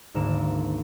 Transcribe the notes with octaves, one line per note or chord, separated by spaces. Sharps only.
G#1 D2 D#3 A#3 F5 E7